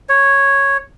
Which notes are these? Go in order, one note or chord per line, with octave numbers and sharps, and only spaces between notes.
C#5